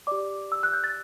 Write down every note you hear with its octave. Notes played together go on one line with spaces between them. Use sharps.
G4 D5 D6
E6
F#6
G6
A6